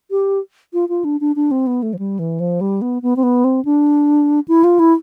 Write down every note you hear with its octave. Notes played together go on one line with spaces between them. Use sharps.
G4
F4
F4
D4
D4
D4
C4
B3
A3
F3
G3
E3
F3
G3
B3
B3
C4
B3
C4
D4
E4
F4
E4